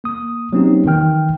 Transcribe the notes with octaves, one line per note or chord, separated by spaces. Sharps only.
A#3 D#6
F#3 A#3 C4 C#4 D#4 G4
D#3 E3 G5 F6